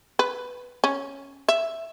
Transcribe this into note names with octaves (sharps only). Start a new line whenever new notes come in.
B4
C#4
E5